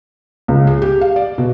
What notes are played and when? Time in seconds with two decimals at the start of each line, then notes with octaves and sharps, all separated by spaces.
0.48 C#2
0.67 G#4
0.82 G4
1.01 F5
1.16 D5
1.38 B2